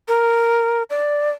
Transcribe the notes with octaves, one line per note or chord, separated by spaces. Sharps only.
A#4
D5